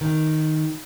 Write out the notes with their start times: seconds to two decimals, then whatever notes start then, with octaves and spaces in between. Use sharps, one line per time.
0.01 D#3